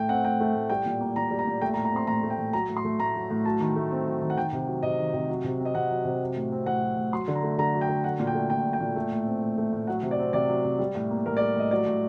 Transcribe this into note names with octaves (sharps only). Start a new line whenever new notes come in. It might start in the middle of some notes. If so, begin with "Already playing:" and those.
Already playing: A2 A3 G5
C4 F#5
A2 G5
A3
A2
G3 G5
A#2
A#3
A#2 A#5
G3
A#5
A#2
A3 G5
A#5
A2
A#5
C4 C6
A2 A#5
A3
G5
A2
F#3 A#5
A2
C6
A3
A2 A#5
F#3
A2
F#3 A5
D#3
A3
C4
F#3
D#3
F#5
D#3 G5
C3
F#3
C3 D#5
D#3
C3
F#3
C3
C4
D#5
C3 F#5
F#3
C3
F#3
A2
C4
A2 F#5
F#3
A2
F#3 C6
D3
A#5
A3
D3 A#5
F#3
G5
D3
F#3 F#5
A#2
G5
A3
A#2 G5
F#3
G5
A#2
A3
A2
C4
A2
A3
A2
F#3 F#5
C3
D5
C4
C3 D5
F#3
C3
G3
A2
A#3
A2 A#4
D5
G3
A2 D#5
F#3 D5
A2